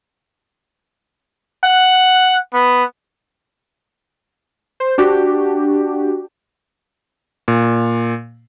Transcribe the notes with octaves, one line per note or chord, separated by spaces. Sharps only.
F#5
B3
C5
D4 F#4 G4
A#2